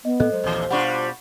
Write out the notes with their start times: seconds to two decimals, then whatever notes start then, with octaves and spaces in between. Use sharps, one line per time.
0.05 B3 D#5
0.20 A2 A3 A4 D#5 F#6
0.32 F#3 G#3 C5
0.44 A#1 D#2 C3 E3
0.70 B2 G3 D4 F4 F#5 B5 C#6